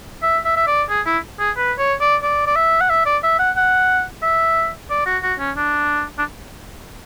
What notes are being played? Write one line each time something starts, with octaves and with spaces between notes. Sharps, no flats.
E5
E5
E5
D5
G#4
E4
G#4
B4
C#5
D5
D5
D5
E5
F#5
E5
D5
E5
F#5
F#5
E5
D5
F#4
F#4
C#4
D4
D4